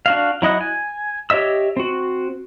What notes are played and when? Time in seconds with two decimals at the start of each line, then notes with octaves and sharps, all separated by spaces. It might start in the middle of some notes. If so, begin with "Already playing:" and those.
0.06 D4 F#4 F5
0.42 F#3 E4 D#5 F#5
0.61 G#5
1.30 G4 C#5 D#5 E5 E6
1.77 C4 F#4